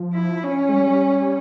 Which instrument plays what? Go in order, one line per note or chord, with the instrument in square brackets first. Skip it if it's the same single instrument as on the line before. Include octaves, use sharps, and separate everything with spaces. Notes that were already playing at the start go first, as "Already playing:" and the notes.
Already playing: [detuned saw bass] F3
[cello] E4
C#4
[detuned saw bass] G#3
G3